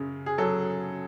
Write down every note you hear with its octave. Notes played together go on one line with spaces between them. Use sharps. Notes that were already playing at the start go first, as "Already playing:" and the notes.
Already playing: F#2 C#3
G#4
F#3 A4